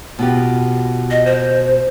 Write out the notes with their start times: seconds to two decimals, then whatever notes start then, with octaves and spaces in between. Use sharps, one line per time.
0.19 B2 F4 G4
1.11 D#5
1.25 C5